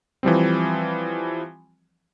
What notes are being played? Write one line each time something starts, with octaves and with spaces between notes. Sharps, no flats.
E3 F3 G3 C4